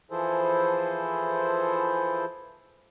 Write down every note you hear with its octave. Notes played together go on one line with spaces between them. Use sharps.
E3 F3 E4 G#4 A4 C5